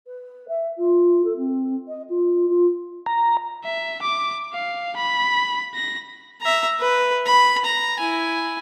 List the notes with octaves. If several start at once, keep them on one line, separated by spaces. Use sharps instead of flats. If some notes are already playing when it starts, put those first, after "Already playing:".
B4
E5
F4
A4
C4
D#5
F4
F4
A#5
E5
D6
F5
B5
A#6
E5 A#5
B4
B5
A#5
E4 G#5